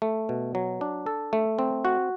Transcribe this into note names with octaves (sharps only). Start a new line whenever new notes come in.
A3
B2
F#3
D4
A4
A3
C4
F#4